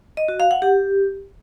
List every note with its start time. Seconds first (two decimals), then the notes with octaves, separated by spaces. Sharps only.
0.17 D#5
0.28 F#4
0.40 F5
0.51 F#5
0.62 G4